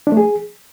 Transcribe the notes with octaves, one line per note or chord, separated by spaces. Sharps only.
D4
A3
G#4